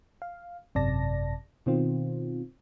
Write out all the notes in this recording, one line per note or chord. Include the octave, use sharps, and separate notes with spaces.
F5
G#1 F#2 C3 D5 A5 A#6
B2 D#3 C4 F4